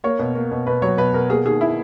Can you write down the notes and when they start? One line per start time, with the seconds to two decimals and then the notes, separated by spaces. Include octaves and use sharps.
0.04 A#3 C#5
0.19 B2
0.35 A#3
0.51 B2
0.67 B2 B4
0.82 F#3 C#5
0.98 B2 B4
1.14 B2 A#4
1.29 A#3 G#4
1.45 D#3 G#4
1.61 E4